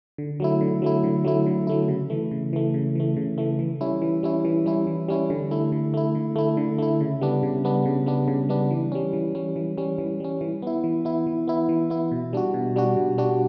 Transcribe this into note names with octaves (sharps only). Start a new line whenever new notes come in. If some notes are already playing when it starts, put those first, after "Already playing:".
D3
F#3 A3 E4
D3
F#3 A3 E4
D3
F#3 A3 E4
D3
F#3 A3 E4
C#3
E3 A3
C#3
E3 A3
C#3
E3 A3
C#3
E3 A3
E3
G3 C#4 E4
E3
G3 C#4 E4
E3
G3 C#4 E4
E3
G3 C#4 E4
D3
A3 E4
D3
A3 E4
D3
A3 E4
D3
A3 E4
C#3
G3 B3 D4
C#3
G3 B3 D4
C#3
G3 B3 D4
C#3
G3 B3 D4
E3
G3 C#4
E3
G3 C#4
E3
G3 C#4
E3
G3 C#4
E3
B3 E4
E3
B3 E4
E3
B3 E4
E3
B3 E4
B2
G3 D4 F#4
B2
G3 D4 F#4
B2
G3 D4 F#4